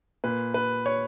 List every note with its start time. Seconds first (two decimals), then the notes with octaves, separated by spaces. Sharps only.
0.24 A#2 B4
0.54 B4
0.86 C#5